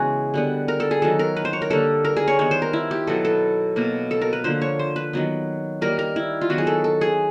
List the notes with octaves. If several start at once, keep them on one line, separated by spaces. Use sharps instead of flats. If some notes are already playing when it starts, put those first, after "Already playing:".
Already playing: C#3 E3 G#3 B3 F#4 G#4
D3 G3 B3
A#4
A4
G#4
D#3 F#3 B3 A4
A#4
B4
C5
C#5
A#4
D3 G3 A#3 A4
A#4
G#4
C#5
D#3 G3 B3 C#5
C5
A#4
E4
G4
B2 F#3 B3 A4
A4
B2 F#3 A#3
A4
A#4
B4
D3 F3 A#3 C5
C#5
C5
B4
D#3 F#3 B3
D#3 G3 A#3 A#4
A#4
E4
F4
D#3 F#3 B3 F#4
G#4
A4
A4
G#4